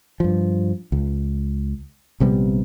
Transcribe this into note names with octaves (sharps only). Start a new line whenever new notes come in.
G2 F3
C#2
A#1 C3 G3 B3